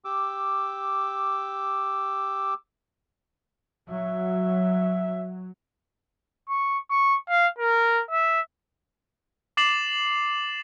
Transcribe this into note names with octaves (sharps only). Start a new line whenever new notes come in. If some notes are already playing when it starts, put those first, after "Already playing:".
G4 D6 E6
F#3 E5
C#6
C#6
F5
A#4
E5
D6 A6 C7 E7 F#7